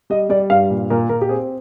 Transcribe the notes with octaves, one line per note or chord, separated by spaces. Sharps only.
G3 D#5
G3 D5
G2 F5
A#2
A#2 A#4
A#2 A#4
G4
C4 G#4